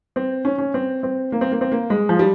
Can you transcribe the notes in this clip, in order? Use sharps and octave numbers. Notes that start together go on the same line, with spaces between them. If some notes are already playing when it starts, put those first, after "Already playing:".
C4
C#4
C#4
C4
C4
A#3
C4
A#3
C4
A#3
G#3
F3
G3